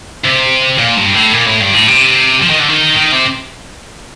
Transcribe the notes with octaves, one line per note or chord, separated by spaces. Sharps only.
C3
A#2
G2
A2
A#2
A2
G2
A2
C3
F3
D#3
D3
D#3
D#3
C3